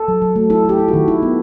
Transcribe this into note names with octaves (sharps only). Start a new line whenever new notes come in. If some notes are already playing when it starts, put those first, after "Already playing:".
Already playing: A4
F#3
F#3
A3
E4 A4
E4 G4
E4
F#4
D#3
E4
B3